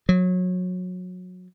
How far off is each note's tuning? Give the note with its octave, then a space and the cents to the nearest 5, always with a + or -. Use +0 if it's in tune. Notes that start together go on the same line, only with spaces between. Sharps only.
F#3 -25